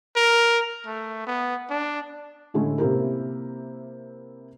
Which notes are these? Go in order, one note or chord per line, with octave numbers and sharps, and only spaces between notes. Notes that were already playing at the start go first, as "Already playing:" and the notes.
A#4
A3
B3
D4
A2 D3 G#3 A3 C#4 E4
C3 A#3 E4 G4 A#4